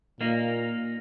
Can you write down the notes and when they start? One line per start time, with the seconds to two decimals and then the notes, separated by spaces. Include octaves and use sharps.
0.21 A#2 A#3 D#4